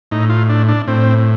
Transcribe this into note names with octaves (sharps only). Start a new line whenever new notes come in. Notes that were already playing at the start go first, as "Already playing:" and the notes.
A2 D#4
F4
D4
D4
A2 C4